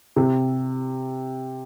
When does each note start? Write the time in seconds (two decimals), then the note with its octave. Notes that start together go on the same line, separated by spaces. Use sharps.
0.16 C3